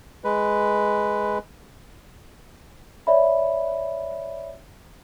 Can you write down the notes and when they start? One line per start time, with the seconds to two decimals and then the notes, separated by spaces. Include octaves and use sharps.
0.24 G#3 B4
3.07 C#5 D5 E5 B5